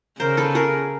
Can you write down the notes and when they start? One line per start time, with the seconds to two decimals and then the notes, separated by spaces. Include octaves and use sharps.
0.19 C#3 A#4 C5
0.37 A4 B4
0.55 G#4 A#4